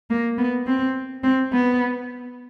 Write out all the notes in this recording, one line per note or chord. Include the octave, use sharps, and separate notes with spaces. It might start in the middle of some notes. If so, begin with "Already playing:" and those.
A#3
B3
C4
C4
B3